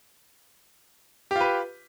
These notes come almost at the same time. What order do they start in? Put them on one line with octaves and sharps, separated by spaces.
G4 F4 B4